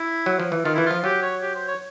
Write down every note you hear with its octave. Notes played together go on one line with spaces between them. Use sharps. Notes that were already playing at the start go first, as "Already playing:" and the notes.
Already playing: E4
F#3
F3
E3
D#3 F4
E3 E4
F3 F4
F#3 G4
C#5
G4
C5
C#5